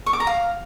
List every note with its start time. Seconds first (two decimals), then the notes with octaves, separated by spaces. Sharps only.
0.06 C#6
0.13 D6
0.20 A#5
0.27 F5